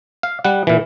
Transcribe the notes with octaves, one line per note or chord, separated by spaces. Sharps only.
F5
G3 F#5
A#2 E3